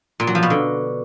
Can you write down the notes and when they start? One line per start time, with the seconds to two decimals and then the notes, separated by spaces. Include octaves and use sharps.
0.20 A#2
0.27 F#3
0.35 F3
0.43 B2
0.50 D3